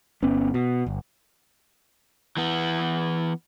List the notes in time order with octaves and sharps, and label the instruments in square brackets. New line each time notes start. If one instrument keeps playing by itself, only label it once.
[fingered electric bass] G1 B3 C#4
B2
G1
[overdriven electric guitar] E3 B3